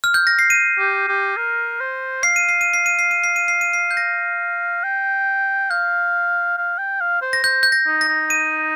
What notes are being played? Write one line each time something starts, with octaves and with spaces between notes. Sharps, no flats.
F6
G6
A#6
C7
D#7
G4
G4
A#4
C5
F5 C7
D#7
C7
D#7
C7
D#7
C7
D#7
C7
D#7
C7
D#7
C7
G6
A#6
G5
F5 G6
F5
G5
F5
C5
A#6
C5 G6
G6
A#6
D#4
A#6
D#4
D#7